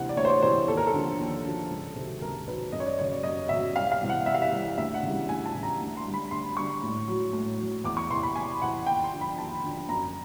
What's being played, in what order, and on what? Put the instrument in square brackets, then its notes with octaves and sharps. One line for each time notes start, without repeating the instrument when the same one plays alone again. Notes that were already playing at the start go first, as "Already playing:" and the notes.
Already playing: [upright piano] D2 C3 E3 F#5
D5
D2 C#5
C5
C#5
C3 E3 C5
D#2 A4
A#4
A4
D3 F3
D#2
D3 F3
C#2
C3 D#3 F#3
C#2 A#4
C3 D#3 F#3 B4
F#2 D#5
C#5
D5
C#3 F#3 C#5
D5
F#2 D#5
C#3 F#3 E5
C2 F5
F5
C3 E3 G3
F#5
C2 E5
F5
E5
C3 E3 G3
D2 E5
F#5
C#3 E3 G3
D2 G#5
A5
C#3 E3 G3
A#5
D2
C6
D3 G3
B5
D2 C6
D3 G3 C#6
A2
F#3
A2
F#3
E2 D6
C#6
C3 E3 C6
B5
E2 G#5
C3 E3 F#5
D#2 G5
C6
D3 F3
B5
D#2 A5
D3 F3
F#2 A#5